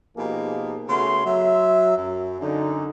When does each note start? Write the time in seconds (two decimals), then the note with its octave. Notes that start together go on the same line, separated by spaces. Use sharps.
0.17 B2 F3 A#3 D#4 G4 G#4
0.89 C#3 A3 B3 F#4 C6
1.26 F#3 E5
1.98 F#2
2.41 F#2 D3 D#4